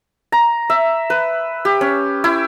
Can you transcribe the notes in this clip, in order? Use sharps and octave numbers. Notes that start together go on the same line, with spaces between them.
A#5
E5
B4
G4
C#4
E4